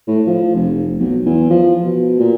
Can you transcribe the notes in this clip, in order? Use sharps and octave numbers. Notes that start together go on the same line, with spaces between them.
A2
F3
F1
B1
E2
F3
B2
A#2